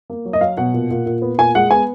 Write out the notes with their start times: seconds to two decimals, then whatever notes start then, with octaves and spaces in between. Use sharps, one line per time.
0.10 A#3
0.25 F#3
0.33 D#5
0.41 F#3 F5
0.57 B2 F#5
0.74 A#2
0.91 A#2
1.06 A#2
1.22 B3
1.38 A#2 G#5
1.55 G#3 F#5
1.71 B3 G#5